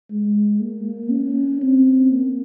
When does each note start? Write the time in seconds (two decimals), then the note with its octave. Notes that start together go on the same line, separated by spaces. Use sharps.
0.11 G#3
0.60 A#3
1.11 C#4
1.62 C4
2.11 A#3